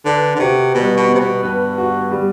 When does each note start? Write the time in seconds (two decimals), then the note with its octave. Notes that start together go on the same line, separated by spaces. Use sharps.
0.05 D3 B4
0.36 D3
0.39 C3 F#4
0.74 B2 G3
0.97 B2
1.09 B3
1.15 C3
1.20 B2
1.43 G2 B4
1.78 F#4
2.11 G3